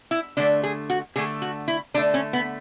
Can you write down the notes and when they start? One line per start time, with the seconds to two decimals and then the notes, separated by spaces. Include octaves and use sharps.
0.11 E4
0.37 D3 A3 D4
0.63 G#4
0.90 F#4
1.16 D3 A3 G#4
1.42 F#4
1.68 E4
1.94 D3 D4
1.98 A3
2.14 C#4
2.33 B3